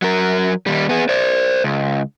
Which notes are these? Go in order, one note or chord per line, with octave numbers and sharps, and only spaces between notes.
F#3 A#4
D#2 G3
B3 G#4
C5 D5
C#2